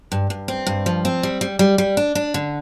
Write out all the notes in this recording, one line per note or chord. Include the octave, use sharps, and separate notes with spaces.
G2
G2
C4
G2
F3
C4
G3
G3
G3
G3
D4
D4
D3